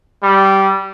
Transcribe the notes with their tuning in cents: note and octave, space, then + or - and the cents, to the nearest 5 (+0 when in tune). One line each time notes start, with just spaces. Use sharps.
G3 -15